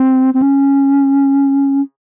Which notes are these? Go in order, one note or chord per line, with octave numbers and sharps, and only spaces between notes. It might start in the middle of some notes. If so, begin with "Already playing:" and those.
Already playing: C4
C4
C#4